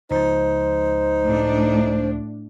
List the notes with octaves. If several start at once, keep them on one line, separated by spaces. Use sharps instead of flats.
C#2 F3 D#4 C5
A2 D4